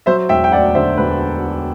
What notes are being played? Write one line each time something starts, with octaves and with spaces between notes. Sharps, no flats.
F#3 C5 E5
E1 E5 G5
G5
D2 D5 F#5
D3 C5 E5
E1 B4